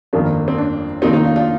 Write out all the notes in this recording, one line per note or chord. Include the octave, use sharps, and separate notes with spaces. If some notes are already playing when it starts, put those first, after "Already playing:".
G1 F2 D#3 A#3 D4
C4
D4
F1 D#2 D#3 A#3 C4 D#4
C4 D#4
D4 F4
D4 F4